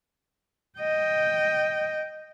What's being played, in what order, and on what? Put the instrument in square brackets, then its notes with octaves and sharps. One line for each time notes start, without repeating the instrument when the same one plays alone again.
[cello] D#5 G5